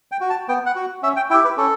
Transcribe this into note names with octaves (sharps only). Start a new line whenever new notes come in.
G5
F#4
A5
B3 G5
F#5
F#4
C#4 E5
G5
E4 G4 G5
B4
C#4 A4